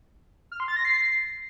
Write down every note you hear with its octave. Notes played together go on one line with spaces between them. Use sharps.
F6
C6
A6
A#6
C7